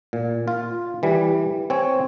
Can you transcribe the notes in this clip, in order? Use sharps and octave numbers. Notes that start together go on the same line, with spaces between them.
A#2
F4
E3 G3
C4 C#5 G#5